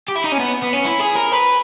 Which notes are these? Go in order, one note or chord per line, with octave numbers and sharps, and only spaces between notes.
G4
E4
D#4
C#4
B3
B3
C#4
E4
G#4
A#4
B4